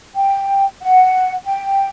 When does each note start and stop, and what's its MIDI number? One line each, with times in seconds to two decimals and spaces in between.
0.15 0.66 79
0.82 1.33 78
1.45 1.89 79